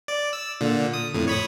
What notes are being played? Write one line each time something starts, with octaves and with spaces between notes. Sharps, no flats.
D5
E6
A#2 D3
D#6
F2 A2
C#5 B5 D#6